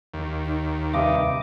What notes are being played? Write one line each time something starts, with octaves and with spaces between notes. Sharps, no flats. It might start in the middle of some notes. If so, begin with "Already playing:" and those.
D#2
D#4
G2 C3 D#5 D6